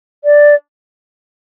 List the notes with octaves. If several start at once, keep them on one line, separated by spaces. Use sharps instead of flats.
D5